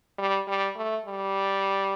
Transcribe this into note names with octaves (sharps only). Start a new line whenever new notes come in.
G3
G3
A3
G3